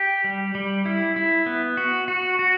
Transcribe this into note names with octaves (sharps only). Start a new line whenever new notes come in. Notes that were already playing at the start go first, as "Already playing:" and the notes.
Already playing: G4
G3
G3
E4
E4
B3
F#4
F#4
F#4